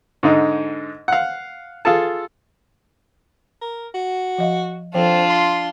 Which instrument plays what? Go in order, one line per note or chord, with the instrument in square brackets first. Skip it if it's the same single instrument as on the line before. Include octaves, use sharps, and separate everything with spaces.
[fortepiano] G#2 D3 D#4
F5 F#5
F4 G#4 A4 A5
[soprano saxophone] A#4
F#4
[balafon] F3 D#5 F5
[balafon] F3 A4 [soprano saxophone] C4 [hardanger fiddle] D4 F4
[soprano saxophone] C6